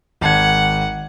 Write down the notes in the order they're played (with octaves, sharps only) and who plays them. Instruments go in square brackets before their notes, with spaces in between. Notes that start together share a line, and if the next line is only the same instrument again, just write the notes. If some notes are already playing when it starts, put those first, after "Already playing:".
[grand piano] G#1 A5 G#6 [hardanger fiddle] F#5